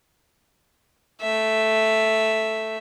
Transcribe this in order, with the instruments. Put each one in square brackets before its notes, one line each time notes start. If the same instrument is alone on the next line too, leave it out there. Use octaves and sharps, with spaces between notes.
[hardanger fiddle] A3 E5